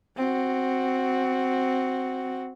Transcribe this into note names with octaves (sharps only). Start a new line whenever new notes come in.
C4 F#4